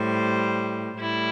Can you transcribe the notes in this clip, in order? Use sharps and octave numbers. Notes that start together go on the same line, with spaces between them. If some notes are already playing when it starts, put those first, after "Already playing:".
Already playing: A2 G3 C5
A2 G3 E4